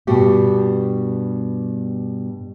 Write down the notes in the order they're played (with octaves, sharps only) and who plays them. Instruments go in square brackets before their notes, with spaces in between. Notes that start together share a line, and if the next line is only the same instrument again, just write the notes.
[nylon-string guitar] G2 B2 G3 F#4 G4